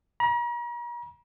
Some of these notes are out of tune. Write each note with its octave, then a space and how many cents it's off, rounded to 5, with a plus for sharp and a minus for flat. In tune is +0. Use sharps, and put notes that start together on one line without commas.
A#5 +45